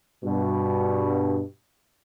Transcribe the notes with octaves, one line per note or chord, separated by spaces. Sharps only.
G2 B2